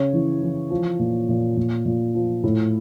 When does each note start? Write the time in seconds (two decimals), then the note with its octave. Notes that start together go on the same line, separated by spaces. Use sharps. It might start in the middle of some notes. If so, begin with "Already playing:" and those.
Already playing: C#3 C#5
0.13 E3
0.42 E3
0.70 F3
0.99 A#2
1.29 A#2
1.57 A#2
1.86 A#2
2.15 F3
2.43 A2